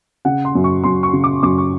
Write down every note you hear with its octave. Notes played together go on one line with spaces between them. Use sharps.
C#3 F#5
C6
F#2
C#6
F#2 C6
C#6
C#3
D6
F#2 D6
C#6